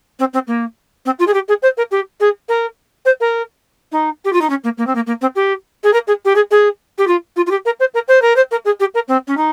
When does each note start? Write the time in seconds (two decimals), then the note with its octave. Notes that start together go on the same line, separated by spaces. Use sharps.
0.19 C4
0.33 C4
0.47 A#3
1.06 C4
1.19 F4
1.27 G#4
1.34 G4
1.48 G#4
1.62 C5
1.77 A#4
1.91 G4
2.20 G#4
2.49 A#4
3.05 C5
3.20 A#4
3.92 D#4
4.25 G4
4.33 F4
4.41 D#4
4.50 C#4
4.64 A#3
4.78 A#3
4.87 C4
4.95 A#3
5.07 A#3
5.21 C4
5.35 G4
5.83 G#4
5.93 A#4
6.07 G#4
6.25 G4
6.36 G#4
6.51 G#4
6.98 G4
7.07 F4
7.36 F4
7.46 F4
7.51 G4
7.65 A#4
7.80 C5
7.94 A#4
8.08 C5
8.22 A#4
8.36 C5
8.51 A#4
8.65 G#4
8.80 G4
8.94 A#4
9.08 C4
9.27 C#4
9.37 D#4